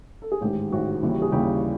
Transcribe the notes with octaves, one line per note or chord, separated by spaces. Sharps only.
A4
G#4
A1 G#2 D#3 G#3 G4
A1 G#2 D#3 G#3 F#4
D#2 C#3 E3 G3
G#4
D#2 C#3 E3 G3 G4